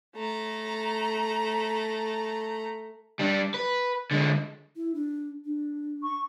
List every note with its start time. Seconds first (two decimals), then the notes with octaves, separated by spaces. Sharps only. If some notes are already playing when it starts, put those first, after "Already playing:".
0.16 A3 A#5
3.19 G3 D4
3.54 B4
4.11 D3 G#3
4.76 E4
4.95 D4
5.45 D4
6.03 C#6